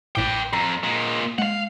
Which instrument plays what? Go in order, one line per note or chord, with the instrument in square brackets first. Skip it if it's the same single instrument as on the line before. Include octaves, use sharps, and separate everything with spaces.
[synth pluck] A1 A2 D6 [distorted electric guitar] B4 G5
[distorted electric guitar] F2 [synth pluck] A#5
[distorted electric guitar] A#2 G#3
[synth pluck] G#3 [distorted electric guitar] F5 F#5